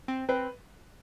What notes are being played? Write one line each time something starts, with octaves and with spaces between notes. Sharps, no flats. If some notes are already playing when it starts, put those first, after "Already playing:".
C4
C4 B4